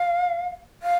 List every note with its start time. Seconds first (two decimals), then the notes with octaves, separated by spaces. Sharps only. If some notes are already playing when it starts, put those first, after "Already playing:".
Already playing: F5
0.83 F5